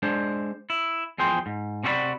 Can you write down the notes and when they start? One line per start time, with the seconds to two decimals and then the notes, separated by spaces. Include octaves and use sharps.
0.03 G#3 D4 C5
0.70 E4
1.18 E2 F3 G#4 G5 C6
1.46 G#2
1.83 C3 C#4 F#4 G#4 D5 B5